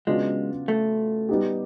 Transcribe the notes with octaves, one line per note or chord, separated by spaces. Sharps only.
C#3 F#3 G#3 B3 D4 F4
A3
G3 B3 D#4 G4